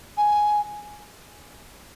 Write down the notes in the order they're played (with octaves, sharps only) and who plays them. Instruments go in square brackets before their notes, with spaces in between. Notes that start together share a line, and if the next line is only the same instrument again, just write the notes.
[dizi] G#5